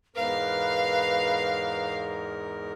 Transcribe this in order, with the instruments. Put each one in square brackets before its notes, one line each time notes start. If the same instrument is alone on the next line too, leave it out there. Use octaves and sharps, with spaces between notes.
[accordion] E2 G#2 A#4 [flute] B4 [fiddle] F5